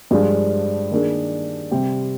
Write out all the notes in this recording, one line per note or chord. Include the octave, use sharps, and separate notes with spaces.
G2 F3 G#3 D4 F4
D#3 A#3 D4 G#4
C3 G3 C4 G4